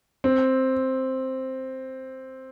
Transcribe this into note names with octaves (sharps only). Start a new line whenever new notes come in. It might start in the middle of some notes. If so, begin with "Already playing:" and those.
C4